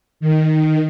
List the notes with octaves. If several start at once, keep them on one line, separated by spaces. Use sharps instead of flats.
D#3